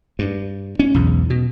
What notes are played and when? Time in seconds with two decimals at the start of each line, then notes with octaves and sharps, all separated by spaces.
0.19 G2
0.79 C#4
0.94 B1 E2 G#2
1.30 B2